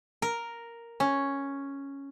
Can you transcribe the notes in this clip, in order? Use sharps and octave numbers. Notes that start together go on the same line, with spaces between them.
A#4
C#4